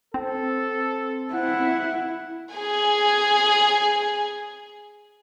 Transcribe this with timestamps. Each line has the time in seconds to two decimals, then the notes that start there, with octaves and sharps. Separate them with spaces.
0.14 C4 A4
1.34 E4 F#5
2.55 G#4 G#5